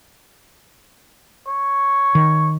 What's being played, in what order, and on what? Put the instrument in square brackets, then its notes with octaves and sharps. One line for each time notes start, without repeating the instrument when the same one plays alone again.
[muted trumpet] C#5
[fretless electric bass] D#3